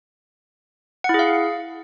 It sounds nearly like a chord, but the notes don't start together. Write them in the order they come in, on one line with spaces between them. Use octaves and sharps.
F#5 E4 G#4 F5